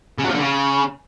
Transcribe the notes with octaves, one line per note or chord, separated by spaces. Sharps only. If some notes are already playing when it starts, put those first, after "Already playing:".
C#3
F#3
F3
D3
C#3